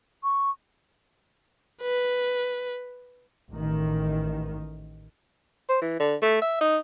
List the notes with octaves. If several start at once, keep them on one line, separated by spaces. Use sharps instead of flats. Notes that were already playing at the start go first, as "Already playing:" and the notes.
C#6
B4
A1 D#3
C5
E3
D3
A3
E5
D#4